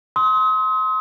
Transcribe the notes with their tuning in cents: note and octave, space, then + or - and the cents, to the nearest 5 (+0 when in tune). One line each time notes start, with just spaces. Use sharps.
C6 +0 D#6 +40